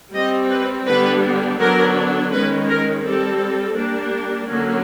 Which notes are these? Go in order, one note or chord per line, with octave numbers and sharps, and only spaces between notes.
G3 C4 D#5
B4
D3 G3 B3 D4 B4
D3 F#3 B3 D4 A#4
D#3 G#3 C#4 B4
A#4
G3 C4 A4
G3 A#3 D4
D3 F#3 A#3 C#4